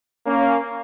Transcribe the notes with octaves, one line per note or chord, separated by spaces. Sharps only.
A#3 C#4